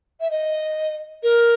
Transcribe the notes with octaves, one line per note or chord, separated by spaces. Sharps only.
E5
D#5
A#4